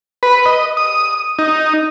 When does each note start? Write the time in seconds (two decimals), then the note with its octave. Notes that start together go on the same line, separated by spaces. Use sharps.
0.23 B4
0.46 D#5
0.77 D#6
1.39 D#4